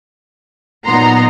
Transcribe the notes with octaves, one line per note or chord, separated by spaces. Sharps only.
A#2 F#3 B3 D#4 A#5 C6